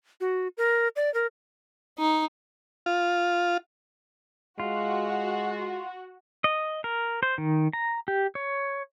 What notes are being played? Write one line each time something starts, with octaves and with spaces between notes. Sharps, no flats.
F#4
A#4
D5
A#4
D#4
F4
G#3 F4 F#4
D#5
A#4
C5
D#3
A#5
G4
C#5